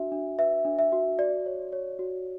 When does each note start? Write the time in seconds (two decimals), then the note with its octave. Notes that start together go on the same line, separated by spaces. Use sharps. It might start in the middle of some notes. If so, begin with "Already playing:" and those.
Already playing: D4 F#4 E5
0.12 D4
0.39 B4 E5
0.65 D4
0.79 E5
0.92 F#4
1.18 F#4 D5
1.46 C#5
1.72 C#5
1.99 F#4